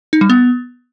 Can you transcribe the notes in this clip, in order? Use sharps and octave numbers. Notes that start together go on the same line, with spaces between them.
D#4
G3
B3